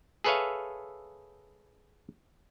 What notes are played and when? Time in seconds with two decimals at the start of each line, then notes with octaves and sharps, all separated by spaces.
0.24 G#4 A4 B4 C#5 E5 F5